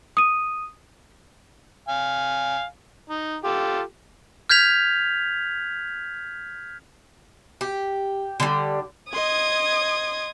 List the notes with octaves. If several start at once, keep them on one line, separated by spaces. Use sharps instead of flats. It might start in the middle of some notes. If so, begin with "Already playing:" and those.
D#6 D#7
F5 G#5
D#4
F4 G4 A4
F6 G6 G#6 B6 F7
G4
D3 G3
D#5 C6 D#6 G#6